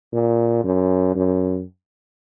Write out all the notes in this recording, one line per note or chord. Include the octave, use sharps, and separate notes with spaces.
A#2
F#2
F#2